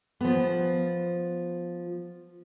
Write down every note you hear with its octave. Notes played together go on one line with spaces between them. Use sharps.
F3 B3